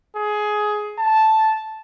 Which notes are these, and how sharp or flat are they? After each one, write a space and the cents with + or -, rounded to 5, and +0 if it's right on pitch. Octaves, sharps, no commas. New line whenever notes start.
G#4 +15
A5 -5